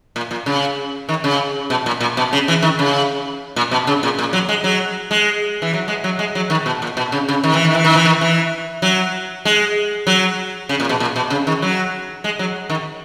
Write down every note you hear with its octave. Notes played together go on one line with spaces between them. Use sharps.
A#2
A#2
C#3
D#3
C#3
B2
A#2
A#2
B2
C#3
E3
D#3
C#3
A#2
B2
C#3
A#2
A#2
F#3
G#3
F#3
G#3
E3
F#3
G#3
F#3
G#3
F#3
D#3
B2
A#2
B2
C#3
C#3
D#3
E3
D#3
E3
D#3
E3
D#3
E3
F#3
G#3
F#3
C#3
A#2
B2
A#2
B2
C#3
D#3
F#3
G#3
F#3
D#3